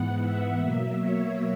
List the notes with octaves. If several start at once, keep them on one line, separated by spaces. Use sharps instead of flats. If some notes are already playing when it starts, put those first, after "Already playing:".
Already playing: G#2 E3 B3 F#5
E5
B2 F#3 A#3
C#5